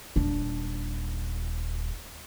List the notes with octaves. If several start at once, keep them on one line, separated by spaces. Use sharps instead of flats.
D#1 D4